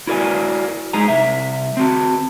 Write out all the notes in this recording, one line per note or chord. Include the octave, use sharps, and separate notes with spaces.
E4 F#4 A#4 D5 G#5
G#3 D#4 G#4 G#5 A#5
C2 E5
C4 F#4